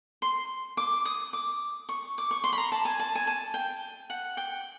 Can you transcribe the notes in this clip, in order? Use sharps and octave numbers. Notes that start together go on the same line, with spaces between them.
C6
D6
D#6
D6
C#6
D6
C#6
C6
B5
A#5
A5
G#5
A5
G#5
A5
G5
F#5
G5